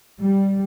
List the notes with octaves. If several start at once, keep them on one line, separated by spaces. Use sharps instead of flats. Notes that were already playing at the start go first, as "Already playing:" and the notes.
G3